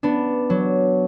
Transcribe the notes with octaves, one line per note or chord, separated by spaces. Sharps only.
B3 D4
F#3